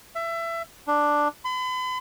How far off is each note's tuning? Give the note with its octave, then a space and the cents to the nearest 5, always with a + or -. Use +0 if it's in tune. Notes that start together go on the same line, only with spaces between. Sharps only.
E5 +25
D4 +5
B5 +45